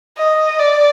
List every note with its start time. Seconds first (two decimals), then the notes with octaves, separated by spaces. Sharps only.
0.17 D#5
0.59 D5